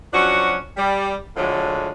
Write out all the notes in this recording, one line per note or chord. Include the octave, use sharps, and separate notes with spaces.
F3 F#3 C#4 D4 F#4
G3
A2 D3 F3 F#3 G#3